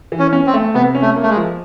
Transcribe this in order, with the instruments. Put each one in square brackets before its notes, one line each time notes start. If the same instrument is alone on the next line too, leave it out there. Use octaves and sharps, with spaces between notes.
[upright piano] E3
[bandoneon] C#4
[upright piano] C#4
[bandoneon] C4
[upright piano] A3
[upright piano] C3 [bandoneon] B3
[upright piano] C#4
[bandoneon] A3
[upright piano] A#3
[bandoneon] A3
G#3
[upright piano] F3